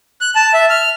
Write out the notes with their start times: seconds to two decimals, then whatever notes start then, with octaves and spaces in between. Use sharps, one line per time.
0.21 F#6
0.35 A5
0.54 E5
0.70 F6